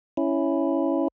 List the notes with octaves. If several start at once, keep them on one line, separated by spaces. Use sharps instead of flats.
C#4 E4